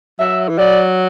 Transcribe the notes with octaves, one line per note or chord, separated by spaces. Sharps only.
F#3 E5
E3
F#3 D5